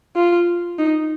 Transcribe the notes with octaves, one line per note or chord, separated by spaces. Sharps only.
F4
D#4